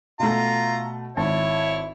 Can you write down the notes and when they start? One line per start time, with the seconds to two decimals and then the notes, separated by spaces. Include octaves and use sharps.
0.20 B2 A3 F4 A#5
1.17 G#1 E4 C#5 A5